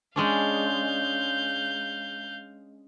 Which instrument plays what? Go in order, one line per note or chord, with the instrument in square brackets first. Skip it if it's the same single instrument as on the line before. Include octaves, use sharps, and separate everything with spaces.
[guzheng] G#3 C#4 D4 [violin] F5 G6